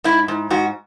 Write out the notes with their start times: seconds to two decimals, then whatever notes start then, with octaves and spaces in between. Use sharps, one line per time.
0.04 G#2 E4
0.28 G#2
0.50 G#2 F#4